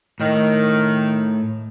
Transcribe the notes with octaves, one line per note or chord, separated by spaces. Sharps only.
A2 D#3